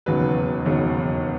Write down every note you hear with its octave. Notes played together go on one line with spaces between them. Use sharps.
E1 D#2 C#3 F#3 B4
E1 D#2 C#3 F#3